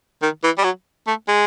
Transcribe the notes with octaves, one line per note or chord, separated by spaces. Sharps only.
D#3
E3
G3
F#3
A3
G#3